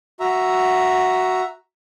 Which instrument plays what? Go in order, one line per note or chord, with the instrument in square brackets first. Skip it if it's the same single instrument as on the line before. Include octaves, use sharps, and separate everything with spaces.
[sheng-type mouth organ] F#4 E5 A#5